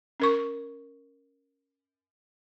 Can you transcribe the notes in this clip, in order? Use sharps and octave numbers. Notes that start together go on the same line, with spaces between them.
C#4 A#4 C#6